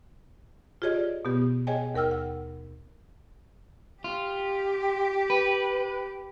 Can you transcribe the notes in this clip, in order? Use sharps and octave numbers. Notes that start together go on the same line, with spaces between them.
F4 G4 G#4 C#5 D#5
D5
B2 B3 G4
G#4 C#5 D#5 G5 G#5
D#2 A#4 G5 E6 F6
F#5
F4 G4
B4